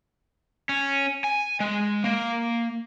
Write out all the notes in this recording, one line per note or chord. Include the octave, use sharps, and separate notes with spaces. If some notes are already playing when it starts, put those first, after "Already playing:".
C#4
G#5
G#3
A#3